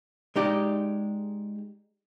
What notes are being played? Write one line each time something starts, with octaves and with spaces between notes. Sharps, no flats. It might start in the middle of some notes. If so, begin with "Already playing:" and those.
G#3 D#4 G4 D5